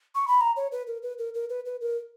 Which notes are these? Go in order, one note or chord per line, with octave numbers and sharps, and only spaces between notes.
C#6
B5
A#5
C#5
B4
A#4
B4
A#4
A#4
B4
B4
A#4